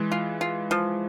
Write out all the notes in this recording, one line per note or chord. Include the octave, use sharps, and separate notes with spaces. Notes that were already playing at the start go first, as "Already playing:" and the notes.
Already playing: E3 G#3
F4
F4
F3